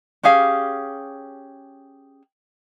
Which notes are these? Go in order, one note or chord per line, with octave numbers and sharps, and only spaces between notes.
C#4 G4 G#4 F5